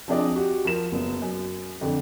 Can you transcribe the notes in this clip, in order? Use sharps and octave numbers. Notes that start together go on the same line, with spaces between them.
F3 C4 D4 G#4 D5 D#5
F#4 G4
F3 A#4 E7
F#1 B3
F#2
F2 D3